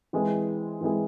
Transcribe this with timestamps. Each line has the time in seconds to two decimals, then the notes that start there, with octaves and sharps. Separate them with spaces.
0.13 E3 G#3 C4 E4 G#4
0.81 E3 G#3 C4 E4 G#4